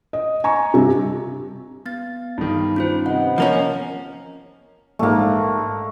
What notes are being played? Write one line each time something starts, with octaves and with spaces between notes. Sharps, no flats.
D#5
G#5 A#5 C#6
G2 C3
B3 A6
G2 D#3
C#4 F4 C5
C3 B3 D#5 F#5
F3 A#3 C#4
A#1 G#2 A3 A#3